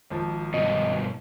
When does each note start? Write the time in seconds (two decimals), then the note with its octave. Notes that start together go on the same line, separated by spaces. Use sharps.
0.10 G#1 F3
0.54 G2 B2 D#5